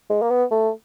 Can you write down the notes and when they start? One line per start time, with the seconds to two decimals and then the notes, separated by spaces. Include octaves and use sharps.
0.10 G#3
0.22 A#3
0.30 B3
0.51 A3